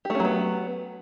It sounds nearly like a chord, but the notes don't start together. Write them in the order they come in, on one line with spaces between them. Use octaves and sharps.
G4 A3 C#4 F#3 B3